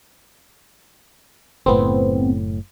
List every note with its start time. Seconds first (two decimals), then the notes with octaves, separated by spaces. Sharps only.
1.66 F#1 A2 B3 C4